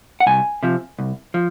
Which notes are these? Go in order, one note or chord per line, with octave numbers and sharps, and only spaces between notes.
F#5
C2 G#5
C3 F3
C2
F3